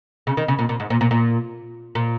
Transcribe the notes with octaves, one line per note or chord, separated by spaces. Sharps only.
C#3
D#3
C#3
A#2
A#2
G#2
A#2
A#2
A#2
A#2